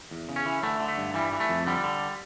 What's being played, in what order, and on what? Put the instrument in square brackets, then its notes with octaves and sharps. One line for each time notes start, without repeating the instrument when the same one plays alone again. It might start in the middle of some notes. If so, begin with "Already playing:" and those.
[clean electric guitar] E2
C#3
C#4
E3
D3 A3
D3
A3
G2
E3 G3
E3
A3
F2
D3 G3
D3